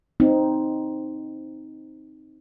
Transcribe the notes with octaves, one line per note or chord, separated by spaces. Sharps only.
C4 D#4